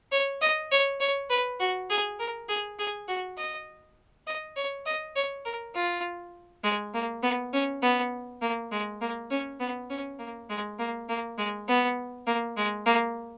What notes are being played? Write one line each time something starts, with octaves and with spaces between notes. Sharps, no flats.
C#5
D#5
C#5
C#5
B4
F#4
G#4
A#4
G#4
G#4
F#4
D#5
D#5
C#5
D#5
C#5
A#4
F4
G#3
A#3
B3
C#4
B3
A#3
G#3
A#3
C#4
B3
C#4
A#3
G#3
A#3
A#3
G#3
B3
A#3
G#3
A#3